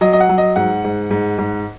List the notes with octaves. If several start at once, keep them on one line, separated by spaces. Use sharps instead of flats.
F#3 D#5
D#5
F#5
F#3
D#5
G#2 F#5
G#2
G#2
G#2